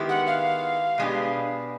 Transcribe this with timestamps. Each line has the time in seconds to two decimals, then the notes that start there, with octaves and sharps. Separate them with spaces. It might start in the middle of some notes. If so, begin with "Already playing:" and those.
Already playing: D#3 G#3 B3 E4 G4
0.09 F#5
0.27 F5
0.98 B2 G#3 B3 D4 G4